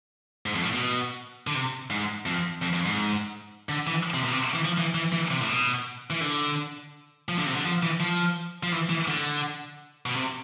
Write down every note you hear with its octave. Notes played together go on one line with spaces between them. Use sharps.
G#2
F2
A2
B2
D3
C3
G#2
F2
F2
F2
G#2
D3
E3
C3
B2
C3
E3
F3
E3
E3
E3
C3
A2
B2
E3
D3
F3
D3
C3
D3
F3
E3
F3
F3
E3
E3
D3
B2
C3